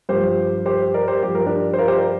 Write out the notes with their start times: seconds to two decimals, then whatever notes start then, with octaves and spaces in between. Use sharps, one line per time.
0.09 G2 F3 G4 C5
0.66 G4 C5
0.94 A#4 D5
1.08 G4 C5
1.22 G2 F3 G4
1.35 A#4
1.46 D4 G4
1.73 C5
1.78 F4 A#4
1.88 G4 C5
1.98 A#4 D5